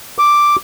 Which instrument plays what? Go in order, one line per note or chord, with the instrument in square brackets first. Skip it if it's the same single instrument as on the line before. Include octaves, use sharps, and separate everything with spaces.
[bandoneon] D6